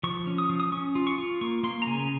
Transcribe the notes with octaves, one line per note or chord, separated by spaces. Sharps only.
F3 C#6
C#4
D#6
F3
D#6
C#4 C#6
F4
C#6
F4
A#3 C#6
A#3 C6
A#5
C#3 G#5